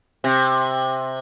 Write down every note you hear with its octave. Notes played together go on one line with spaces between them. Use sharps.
C3